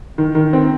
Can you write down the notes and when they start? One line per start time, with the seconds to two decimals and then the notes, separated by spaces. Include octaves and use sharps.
0.18 D#3
0.35 D#3
0.53 C4